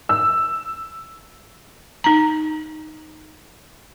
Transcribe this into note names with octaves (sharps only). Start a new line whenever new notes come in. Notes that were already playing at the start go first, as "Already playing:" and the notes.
E6
D#4 A#5